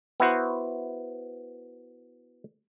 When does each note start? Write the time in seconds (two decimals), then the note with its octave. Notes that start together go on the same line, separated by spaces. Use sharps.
0.20 B3 E4 F#4 C5